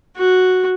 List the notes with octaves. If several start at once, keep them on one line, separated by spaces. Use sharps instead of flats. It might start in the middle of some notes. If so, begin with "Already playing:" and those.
F#4